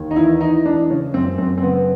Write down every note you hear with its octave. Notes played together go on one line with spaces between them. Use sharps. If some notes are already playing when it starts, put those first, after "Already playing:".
Already playing: D#2
D#4
E2 E4
E3 D#4
E3 D4
C#3 C#4
F#2 C4
F#2 C4
C4
C#3 B3